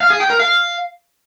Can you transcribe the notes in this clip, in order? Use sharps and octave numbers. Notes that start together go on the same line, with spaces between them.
F5
G#4
G5
A#4
F5